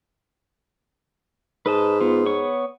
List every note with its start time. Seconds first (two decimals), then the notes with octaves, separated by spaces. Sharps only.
1.66 G#2 B4 D#5 A5
2.01 B3 F4
2.26 B3 C#5 C#6